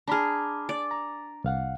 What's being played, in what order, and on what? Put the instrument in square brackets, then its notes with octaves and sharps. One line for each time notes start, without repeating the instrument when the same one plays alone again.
[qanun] D4 G#4 [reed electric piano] A#5 B5 F6
[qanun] D5
[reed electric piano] A#5
C2 F5 F#5